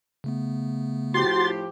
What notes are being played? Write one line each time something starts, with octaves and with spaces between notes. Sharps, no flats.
C#3 A3 B3
A2 F3 F#4 G4 C6 A6